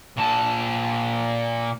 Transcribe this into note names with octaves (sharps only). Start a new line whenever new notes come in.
A#2 A5